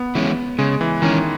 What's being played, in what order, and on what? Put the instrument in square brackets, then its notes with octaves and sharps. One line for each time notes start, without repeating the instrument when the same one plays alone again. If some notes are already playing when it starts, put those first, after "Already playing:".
Already playing: [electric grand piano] B3
[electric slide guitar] E3 G#3 C#4
[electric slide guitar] C#3 [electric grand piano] G#3
[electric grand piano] E3
[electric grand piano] D#3 [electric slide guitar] E3 G#3 C#4